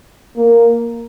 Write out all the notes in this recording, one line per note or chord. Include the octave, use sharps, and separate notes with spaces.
A#3